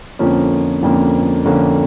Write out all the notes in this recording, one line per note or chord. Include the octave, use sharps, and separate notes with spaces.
F2 D3 F3 A#3 C#4
F2 D3 F3 A#3 C#4
F2 D3 F3 A#3 C#4